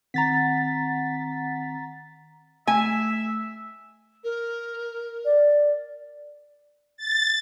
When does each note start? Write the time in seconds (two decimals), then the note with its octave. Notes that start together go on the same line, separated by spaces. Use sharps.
0.14 D#3 C4 F#5 A#5 A6 B6
2.67 A3 E5 G#5
4.23 A#4
5.25 D5
6.97 A6